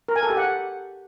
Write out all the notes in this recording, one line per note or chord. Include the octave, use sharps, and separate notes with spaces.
A#4
G#5
A4
G4
F#5